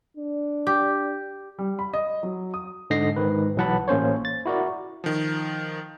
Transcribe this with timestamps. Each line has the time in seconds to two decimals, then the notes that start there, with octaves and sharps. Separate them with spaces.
0.17 D4
0.67 G4
1.59 G3
1.79 B5
1.94 D#5
2.23 F#3
2.54 D#6
2.90 G#2 D3 D#5 A#6 C7
3.16 G#2 D#3 B4
3.56 B1 E3 F#3 F#5 A5 B5
3.88 A1 A#3 C#4 C5 C#5
4.25 A6
4.46 E4 F#4 A#4 D5
5.04 D#3 F3